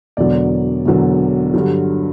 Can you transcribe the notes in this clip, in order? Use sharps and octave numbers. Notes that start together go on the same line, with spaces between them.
E1 E2 D3 F#3 D5
E1 E2 D3 F#3
G2 D3 F#3